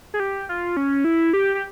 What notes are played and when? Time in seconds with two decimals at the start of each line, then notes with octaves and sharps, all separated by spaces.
0.14 G#4
0.20 G4
0.49 F4
0.77 C#4
1.04 E4
1.33 G4
1.55 G4